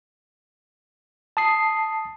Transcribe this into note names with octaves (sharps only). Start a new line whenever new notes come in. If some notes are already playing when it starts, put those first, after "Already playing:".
A5 D#6 C7